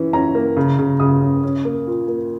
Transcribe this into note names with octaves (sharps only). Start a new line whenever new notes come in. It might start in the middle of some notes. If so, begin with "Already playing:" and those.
Already playing: E3 C#4
C#4 A#5
A#3
C#3
C#3
C#3 D#6
C#4
C#4
A#3
A#2
A#3